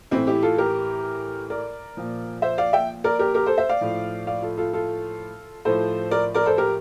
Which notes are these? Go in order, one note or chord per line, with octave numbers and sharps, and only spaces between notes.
A2 E3 C4 E4
E4 G4
F4 A4
G4 A#4
A#4 D5
A#2 F3
C5 E5
D5 F5
E5 G5
A#4 D5
G4 A#4
G4 A#4
A4 C5
C5 E5
D5 F5
A2 F3
D5 F5
F4 A4
F4 A4
F4 A4
A2 F3 A4 C5
A#4 D5
A#4 D5
A4 C5
G4 A#4